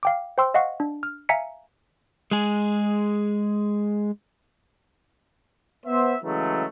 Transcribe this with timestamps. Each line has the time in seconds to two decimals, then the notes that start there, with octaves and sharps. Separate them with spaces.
0.03 F5 G5 D6
0.38 C5 G5 C6 E6
0.54 D#5 F5 F#5 C#6
0.80 D4
1.03 F6
1.29 E5 F5 G#5 A#5 B6 C#7
2.31 G#3 G#4
5.86 B3 C5 E5
6.24 C#3 E3 F#3 G#3 A3